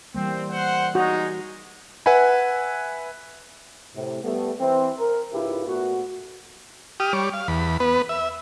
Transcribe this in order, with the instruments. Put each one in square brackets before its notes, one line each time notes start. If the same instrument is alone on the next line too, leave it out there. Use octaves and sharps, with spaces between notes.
[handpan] E3 G3 A#3 [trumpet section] C4
[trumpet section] C5 F#5
[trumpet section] G#3 D#4 [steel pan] F#4
[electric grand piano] B4 E5 F#5 G#5 B5
[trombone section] A2 C3
G3 A3 B3
E3 C4
A#4
C#2 G#2 E4 F4 G4 B4
A#2 A3 B3 F#4
[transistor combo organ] G4 D#6 F6
G3 C#5 D6
F5
E2 B5
B3 B4
E5